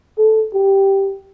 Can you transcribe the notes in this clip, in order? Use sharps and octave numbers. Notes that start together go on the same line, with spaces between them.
A4
G4